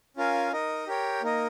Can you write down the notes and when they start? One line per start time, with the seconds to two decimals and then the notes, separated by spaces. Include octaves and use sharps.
0.17 C#4 F4 A#4 F5 G#5
0.52 D#4 A#4 D#5
0.87 G4 A#4 C#5 G5
1.22 A#3 D#4 A#4 D#5